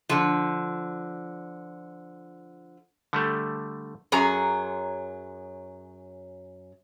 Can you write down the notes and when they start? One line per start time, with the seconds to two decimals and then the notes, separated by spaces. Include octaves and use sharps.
0.09 D3 F3
3.13 D3 G3 A3
4.12 F#2 F#3 G#4 A#5